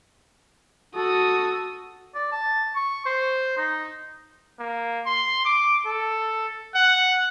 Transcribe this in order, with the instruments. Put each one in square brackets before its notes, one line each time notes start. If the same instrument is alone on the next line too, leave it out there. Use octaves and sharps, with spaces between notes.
[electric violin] F#4 D#6 [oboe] A4
[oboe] D5
A5
C#6
C5
D#4
[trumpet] A#3
C6
D6
A4
F#5